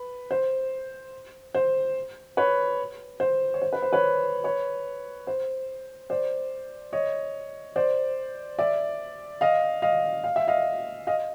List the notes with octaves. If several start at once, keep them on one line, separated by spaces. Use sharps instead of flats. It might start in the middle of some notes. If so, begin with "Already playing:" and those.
Already playing: B4
C5
C5
B4 C#5
C5
C#5
C5
B4
C5
B4 C#5
B4 C#5
C5
C5 D5
C#5 D#5
C5 D5
D5 E5
D#5 F5
D#5 F5
F5
E5
D#5 F5
D#5 F5